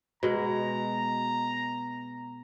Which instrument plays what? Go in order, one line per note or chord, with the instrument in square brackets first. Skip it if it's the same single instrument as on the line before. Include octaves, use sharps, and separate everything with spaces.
[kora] B2 G#3 [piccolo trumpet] A#5